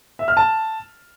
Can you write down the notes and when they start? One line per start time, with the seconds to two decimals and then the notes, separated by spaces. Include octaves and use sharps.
0.19 E5
0.28 F6
0.37 A5